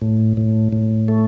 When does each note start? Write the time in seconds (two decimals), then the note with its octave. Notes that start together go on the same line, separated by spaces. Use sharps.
0.02 A2
0.37 A2
0.73 A2
1.08 A3